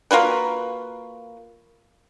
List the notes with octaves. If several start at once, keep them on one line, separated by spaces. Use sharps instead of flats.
A#3 F4 F#4 B4